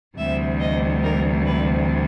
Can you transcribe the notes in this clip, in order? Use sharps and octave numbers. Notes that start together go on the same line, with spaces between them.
D2 C3 E3 G3 E5
D#5
A#4
B4